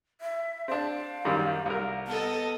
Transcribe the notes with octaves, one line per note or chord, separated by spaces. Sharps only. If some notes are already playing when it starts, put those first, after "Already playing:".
E5
C4 D4 F5
F#2 D#3 G3
C2 A#4
B3 A4 D#5 A5